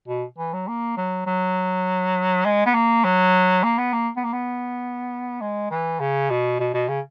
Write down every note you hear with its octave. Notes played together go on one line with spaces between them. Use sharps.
B2
E3
F#3
A#3
F#3
F#3
G#3
B3
A#3
F#3
A#3
B3
A#3
B3
A#3
B3
G#3
E3
C#3
B2
B2
B2
C#3